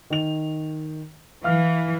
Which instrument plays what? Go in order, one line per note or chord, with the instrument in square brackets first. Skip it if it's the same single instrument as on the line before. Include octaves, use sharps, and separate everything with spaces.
[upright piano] D#3 F7
[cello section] E3 [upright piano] F5 F6